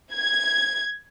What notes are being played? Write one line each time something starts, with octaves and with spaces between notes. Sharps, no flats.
G#6